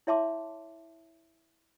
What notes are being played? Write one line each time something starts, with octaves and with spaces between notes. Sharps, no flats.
E4 C#5 E5 A5 C6 D6